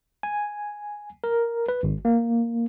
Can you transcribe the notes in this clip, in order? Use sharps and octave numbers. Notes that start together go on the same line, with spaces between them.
G#5
A#4
B4
G#1
A#3